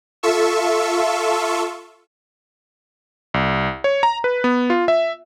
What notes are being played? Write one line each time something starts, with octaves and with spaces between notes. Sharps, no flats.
F4 A4 E5 C#6 E6
C2
C#5
A#5
B4
B3
F4
E5